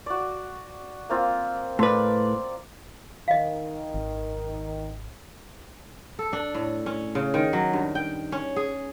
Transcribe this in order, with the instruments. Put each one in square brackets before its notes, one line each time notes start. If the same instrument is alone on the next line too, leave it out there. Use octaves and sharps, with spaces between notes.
[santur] F#4 D5
A#3 C4 F4
[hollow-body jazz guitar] A2 B4 [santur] D5 C6
[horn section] D#3 [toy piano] D#5 F5
[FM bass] G#1
[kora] A4
D4
A2
C#4
C#3
D#3
F#3
G2
G5
C#4
G#4